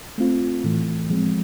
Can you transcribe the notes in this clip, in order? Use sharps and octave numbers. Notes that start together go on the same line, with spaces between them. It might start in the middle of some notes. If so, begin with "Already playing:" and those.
A3 C4 F4
A2 E3 A3
F3 G#3 C4